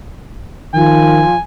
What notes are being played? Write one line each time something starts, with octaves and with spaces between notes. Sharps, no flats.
D#3 F3 G#5